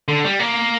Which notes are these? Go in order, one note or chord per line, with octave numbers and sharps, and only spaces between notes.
D3
G3
A#3